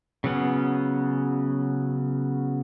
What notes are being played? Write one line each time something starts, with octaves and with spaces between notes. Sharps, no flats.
C#3 F#3 B3 C#4